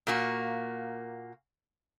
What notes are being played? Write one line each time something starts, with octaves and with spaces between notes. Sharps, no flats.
A#2 A#3 F#4